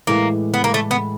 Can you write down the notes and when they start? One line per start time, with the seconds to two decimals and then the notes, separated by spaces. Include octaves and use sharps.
0.07 A2 E3 G#3 A#3
0.54 B3
0.64 A#3
0.74 A3
0.91 B3